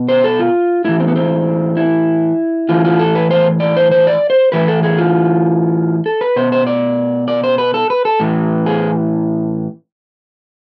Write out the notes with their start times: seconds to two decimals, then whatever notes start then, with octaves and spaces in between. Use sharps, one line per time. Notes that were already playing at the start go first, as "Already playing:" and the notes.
Already playing: B2
0.09 C5
0.24 A4
0.39 F4
0.85 A2 E3 E4
1.00 C4
1.08 B3
1.16 C4
1.77 E4
2.69 A2 E3 F4
2.85 F4
2.99 A4
3.15 B4
3.31 C5
3.60 D5
3.77 C5
3.91 C5
4.07 D5
4.30 C5
4.52 A2 E3 B4
4.68 A4
4.83 G#4
4.98 F4
6.06 A4
6.21 B4
6.36 B2 C5
6.52 C5
6.67 D5
7.28 D5
7.44 C5
7.58 B4
7.74 A4
7.90 B4
8.05 A4
8.20 A2 E3
8.66 G#4